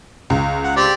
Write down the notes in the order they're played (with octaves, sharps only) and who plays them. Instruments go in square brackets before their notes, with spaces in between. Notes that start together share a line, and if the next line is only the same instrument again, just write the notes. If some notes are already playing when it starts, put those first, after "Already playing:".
[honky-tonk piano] C#2
[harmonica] F#5
C4 G4 D5